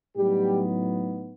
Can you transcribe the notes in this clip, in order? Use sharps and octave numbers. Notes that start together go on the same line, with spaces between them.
A2 F#3 G3 B3 D#4 G4